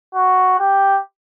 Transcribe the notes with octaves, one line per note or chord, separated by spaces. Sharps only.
F#4
G4